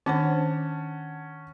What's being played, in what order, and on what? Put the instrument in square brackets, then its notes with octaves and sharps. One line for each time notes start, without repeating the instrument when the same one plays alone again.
[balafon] D#3 D4 C5 [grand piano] C#4 [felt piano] F#5 A5